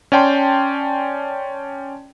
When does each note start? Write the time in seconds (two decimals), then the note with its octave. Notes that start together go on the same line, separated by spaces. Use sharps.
0.12 C#4 D5 G5 A5 C6